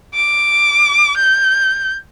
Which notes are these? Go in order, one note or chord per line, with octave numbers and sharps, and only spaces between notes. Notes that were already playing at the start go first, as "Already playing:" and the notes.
D6
G6